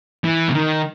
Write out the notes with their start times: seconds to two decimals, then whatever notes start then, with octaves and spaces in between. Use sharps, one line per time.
0.24 E3
0.49 C3
0.54 D#3